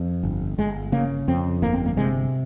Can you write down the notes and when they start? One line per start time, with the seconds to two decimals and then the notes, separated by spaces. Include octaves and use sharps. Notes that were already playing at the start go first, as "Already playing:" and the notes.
Already playing: F2
0.23 G1
0.58 G1 G#3
0.92 C#3 A#3
1.28 F2 C4
1.62 G1 A#3
1.73 C4
1.86 A#3
1.97 C3 G#3